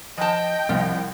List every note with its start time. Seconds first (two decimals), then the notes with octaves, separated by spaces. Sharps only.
0.18 F3 D#5 G5 A5
0.69 C2 F3